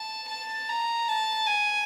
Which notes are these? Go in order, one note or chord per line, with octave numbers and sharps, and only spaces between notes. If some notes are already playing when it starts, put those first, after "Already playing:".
Already playing: A5
A5
A#5
A5
G#5